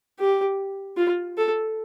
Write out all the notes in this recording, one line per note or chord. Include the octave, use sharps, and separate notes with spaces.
G4
F4
A4